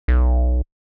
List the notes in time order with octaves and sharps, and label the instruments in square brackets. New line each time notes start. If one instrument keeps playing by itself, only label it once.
[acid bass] B1